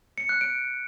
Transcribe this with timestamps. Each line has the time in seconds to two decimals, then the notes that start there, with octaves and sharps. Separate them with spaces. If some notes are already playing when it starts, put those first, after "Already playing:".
0.18 C#7
0.29 F#6
0.41 D7